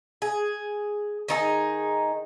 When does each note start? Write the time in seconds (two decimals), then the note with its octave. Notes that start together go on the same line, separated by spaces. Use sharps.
0.22 G#4
1.28 D#3 D#4 G#4